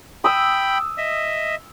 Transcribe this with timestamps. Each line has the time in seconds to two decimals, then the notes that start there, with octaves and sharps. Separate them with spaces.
0.24 G5 B5 D#6 E6
0.98 D#5 E5